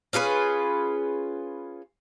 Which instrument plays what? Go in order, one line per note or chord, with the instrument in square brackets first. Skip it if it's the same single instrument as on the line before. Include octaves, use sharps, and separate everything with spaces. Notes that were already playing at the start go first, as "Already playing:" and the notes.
[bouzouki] C#4 F4 G#4 B4